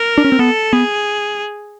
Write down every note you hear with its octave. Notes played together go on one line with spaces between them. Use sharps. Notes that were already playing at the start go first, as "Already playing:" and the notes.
Already playing: A#4
D4
C#4
C4
B3 A4
B3 G#4